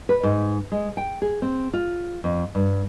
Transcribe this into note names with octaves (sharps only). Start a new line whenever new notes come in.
B4
G#2
G#3
G5
G#4
C4
F4
F2
G2